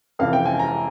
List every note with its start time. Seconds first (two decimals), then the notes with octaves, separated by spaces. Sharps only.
0.19 F2 C3 E3 F5
0.33 G5
0.46 G#5
0.59 A#5